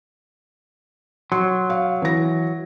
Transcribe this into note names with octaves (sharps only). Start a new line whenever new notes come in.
F#3 C6
F5
E3 A#6